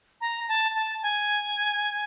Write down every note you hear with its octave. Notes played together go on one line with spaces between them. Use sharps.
A#5
A5
A5
G#5